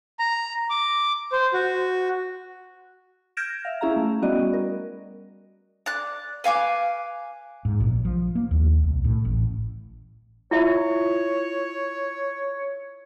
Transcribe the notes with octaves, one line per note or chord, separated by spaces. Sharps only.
A#5
D6
C5
F#4
F6 G6 G#6 A#6 D7 E7
E5 F5
C#4 E4 G#4 E5 F5 A#5
A3
G3 B3 C#4 F#4 D5 D#5
A#4
D5 F#6
B4 F5 G#5 D6
G#2
A#1
F3
A#3
D#2
C2
A2
A1
E4 F4 C#5 E5